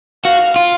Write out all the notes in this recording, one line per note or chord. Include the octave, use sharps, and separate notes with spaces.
F#4 F5
F4